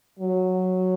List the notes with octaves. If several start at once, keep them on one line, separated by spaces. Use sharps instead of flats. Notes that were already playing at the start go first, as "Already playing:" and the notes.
F#3